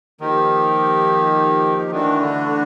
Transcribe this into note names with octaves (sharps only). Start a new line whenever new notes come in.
D#3 F3 A#3 D#4 G4
D#3 E3 A3 D4 F#4
D3
D3